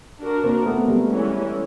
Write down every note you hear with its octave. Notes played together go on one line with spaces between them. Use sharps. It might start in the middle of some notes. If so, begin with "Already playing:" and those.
D4 F#4 A#4
A#3 C4
A3 B3
G3 A3
E3 G#3 C#4